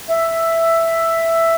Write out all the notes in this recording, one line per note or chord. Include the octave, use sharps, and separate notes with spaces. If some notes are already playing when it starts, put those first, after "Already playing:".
E5